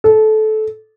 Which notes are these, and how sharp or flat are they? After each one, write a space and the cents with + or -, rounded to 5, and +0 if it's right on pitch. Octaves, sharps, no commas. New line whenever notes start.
A4 -20